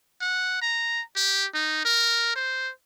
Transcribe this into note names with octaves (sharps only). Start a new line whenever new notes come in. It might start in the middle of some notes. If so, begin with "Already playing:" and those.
F#5
A#5
G4
D#4
A#4
C5